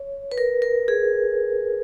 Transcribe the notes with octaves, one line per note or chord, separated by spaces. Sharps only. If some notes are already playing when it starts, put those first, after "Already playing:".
Already playing: C#5
B4
A#4
A#4
G#4